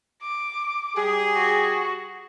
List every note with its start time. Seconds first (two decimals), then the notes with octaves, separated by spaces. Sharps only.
0.22 D6
0.96 G3 G4 G#4
1.34 F#4